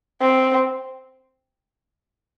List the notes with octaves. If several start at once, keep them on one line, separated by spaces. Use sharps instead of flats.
C4